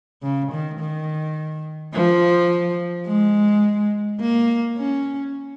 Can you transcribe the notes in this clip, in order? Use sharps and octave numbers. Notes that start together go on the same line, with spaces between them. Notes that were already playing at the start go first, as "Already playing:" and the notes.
C#3
D#3
D#3
F3
G#3
A#3
C#4